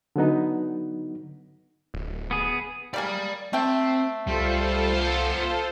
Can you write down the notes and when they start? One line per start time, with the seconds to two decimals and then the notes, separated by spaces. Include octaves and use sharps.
0.16 D3 F#3 B3 D#4
1.94 D1
2.31 B3 G#4
2.94 G3 A#3 G#4 D5 B5
3.53 A3 C4 G5
4.27 C2 G3 F4 A4 C5
4.95 B3 F5